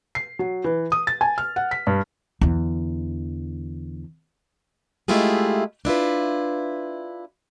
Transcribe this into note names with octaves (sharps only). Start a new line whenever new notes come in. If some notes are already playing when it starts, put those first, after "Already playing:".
C7
F#3
E3
D#6
A6
G#5
F6
F#5
B6
G2
E2 D3
G#3 A3 E4 F4 G4 G#4
D4 E4 F4 B4